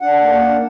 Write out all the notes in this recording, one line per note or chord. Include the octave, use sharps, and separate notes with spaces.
D4 F#5
A#3
D4